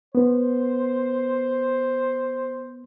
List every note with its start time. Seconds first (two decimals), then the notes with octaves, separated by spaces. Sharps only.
0.15 B3 C5